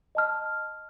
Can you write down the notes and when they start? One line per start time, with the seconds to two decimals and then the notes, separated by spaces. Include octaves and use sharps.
0.15 D#5 A5 F6